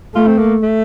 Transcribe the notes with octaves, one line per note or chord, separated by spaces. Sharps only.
A3 F4
C4
A#3
A3